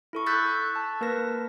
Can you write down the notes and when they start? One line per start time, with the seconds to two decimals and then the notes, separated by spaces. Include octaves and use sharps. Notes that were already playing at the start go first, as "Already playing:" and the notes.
0.13 E4 A4 C#6
0.26 C#6 E6 F#6 G6 A6 B6
0.76 A5
1.01 A#3 A#4 B4 A#6